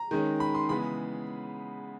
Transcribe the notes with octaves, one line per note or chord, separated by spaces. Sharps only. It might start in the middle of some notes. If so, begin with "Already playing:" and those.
Already playing: A#5
D#3 G#3 C#4
B5
C6
C#3 E3 G#3 B3 B5